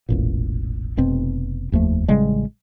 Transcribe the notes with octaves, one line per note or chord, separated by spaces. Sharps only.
E1 A1 A#2
F1 B2 C4
F1 D#2 F3 A3
A1 C#3 G3 G#3